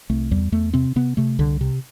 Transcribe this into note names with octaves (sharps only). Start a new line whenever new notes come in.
C2 A3
E2 G3
E2 A3
C3 C4
C3 B3
C3 A3
C2 D3
C3